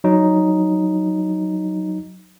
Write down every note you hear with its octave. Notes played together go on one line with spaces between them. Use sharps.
F#3 D#4